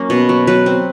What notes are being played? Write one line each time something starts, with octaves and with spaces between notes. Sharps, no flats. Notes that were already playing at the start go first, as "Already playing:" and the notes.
Already playing: F#3 A#3 C#4
B2
F#3
F#3 B4
C4